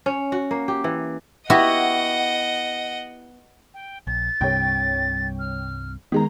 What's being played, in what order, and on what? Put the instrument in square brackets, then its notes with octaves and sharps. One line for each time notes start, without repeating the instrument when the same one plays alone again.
[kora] C#4
F#4
A#3
G4
E3
[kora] B3 E4 G4 [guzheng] F#4 [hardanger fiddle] D#5 F#5
[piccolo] G5
[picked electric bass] A#1 [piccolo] A6
[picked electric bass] C2 G2 C3 [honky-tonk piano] C#5 G5
[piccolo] F6
[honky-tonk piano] D#3 G#3 A#5 [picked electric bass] B3